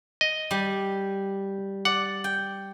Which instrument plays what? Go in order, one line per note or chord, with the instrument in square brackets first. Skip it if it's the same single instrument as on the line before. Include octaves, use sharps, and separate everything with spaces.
[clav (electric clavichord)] D#5
[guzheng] G3
[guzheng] D5 [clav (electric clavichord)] F#5
[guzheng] G5